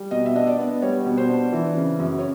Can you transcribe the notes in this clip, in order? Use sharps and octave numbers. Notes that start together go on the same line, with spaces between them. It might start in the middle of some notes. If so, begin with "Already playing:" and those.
Already playing: G3
B2 D#5
E5
D4 D#5
D5
B3
G3 C#5
B2
C5
D4
E3
C#3
F#2
C#5